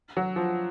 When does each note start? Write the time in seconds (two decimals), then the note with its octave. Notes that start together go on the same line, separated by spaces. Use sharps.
0.17 F#3
0.36 F3